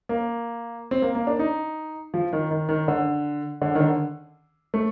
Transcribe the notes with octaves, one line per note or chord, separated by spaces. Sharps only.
A#3
C4
A#3
A#3
D4
D#4
F3
D#3
D#3
D#3
D3
D3
D#3
D3
A3